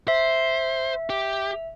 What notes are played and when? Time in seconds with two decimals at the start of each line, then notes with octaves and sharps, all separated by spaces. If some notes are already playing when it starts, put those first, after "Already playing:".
0.08 C5 E5
1.10 G4